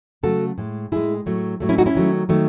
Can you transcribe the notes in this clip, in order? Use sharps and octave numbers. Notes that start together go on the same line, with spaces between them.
C#3 F#3 A3 F#4 A4
A2 G#3
A2 G#3 E4 G#4
A2 F#3 A3
A2 F#3 A3
C#4 E4
D#4 F#4
C#4 E4
D#3 F#3 A3
D#3 F#3 A3